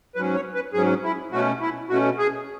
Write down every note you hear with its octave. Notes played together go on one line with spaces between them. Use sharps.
G#2 F#3 C#4 B4
C#5
B4
G#2 F#3 C#4 G#4
E4
B2 A3 C#4 F#4
E4
B2 A3 C#4 F#4
G#4